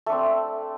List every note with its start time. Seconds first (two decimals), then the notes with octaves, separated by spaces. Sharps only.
0.06 A3
0.09 D4
0.12 C4